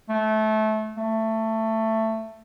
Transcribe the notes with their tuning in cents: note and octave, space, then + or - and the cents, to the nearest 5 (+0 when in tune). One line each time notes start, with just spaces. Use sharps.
A3 -20
A3 +15